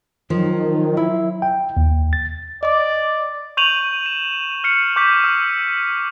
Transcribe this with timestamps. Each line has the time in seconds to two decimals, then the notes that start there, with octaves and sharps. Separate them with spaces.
0.30 D#3 F3 F#3
0.97 E4
1.42 G5
1.77 D#2
2.13 A6
2.63 D5 D#5 D6
3.57 C#6 G6 D#7 F7 F#7
4.06 E7
4.64 F6 C7 C#7
4.96 C#6 D6 G6 B6
5.24 E6